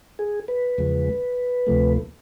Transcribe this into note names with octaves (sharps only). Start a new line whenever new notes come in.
G#4
B4
E2 C#3 F3 G#3
D2 C3 F3 A3